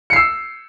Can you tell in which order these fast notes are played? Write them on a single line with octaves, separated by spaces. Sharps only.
C#7 C7 E6